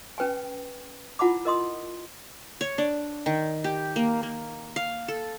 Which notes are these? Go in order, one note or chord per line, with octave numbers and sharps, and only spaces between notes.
C#4 B4 G5 G#5
E4 F4 F#5 A5 B5 D6
A#4 D#5 C6 D#6
C#5
D4
D#3
G4
A#3
A#3
F5
A4